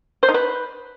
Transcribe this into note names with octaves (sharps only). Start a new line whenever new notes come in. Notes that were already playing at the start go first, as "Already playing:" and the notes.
C5
D#4
B4